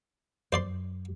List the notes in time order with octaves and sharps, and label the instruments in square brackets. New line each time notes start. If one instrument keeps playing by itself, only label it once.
[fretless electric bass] F#2 [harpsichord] C5 D5 C6